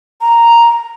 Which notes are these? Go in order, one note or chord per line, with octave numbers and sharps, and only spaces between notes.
A#5